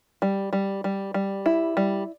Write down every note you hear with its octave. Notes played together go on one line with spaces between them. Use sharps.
G3
G3
G3
G3
E4
G3